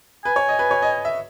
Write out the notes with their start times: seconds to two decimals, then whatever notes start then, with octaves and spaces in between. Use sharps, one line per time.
0.25 B4 G#5
0.36 C#5
0.48 D#5
0.59 B4
0.71 C#5
0.82 D#5
1.05 E5